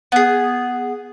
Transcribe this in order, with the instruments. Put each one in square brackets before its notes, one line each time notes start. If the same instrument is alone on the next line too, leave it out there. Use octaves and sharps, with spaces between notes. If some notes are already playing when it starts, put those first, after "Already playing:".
[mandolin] B3 G#4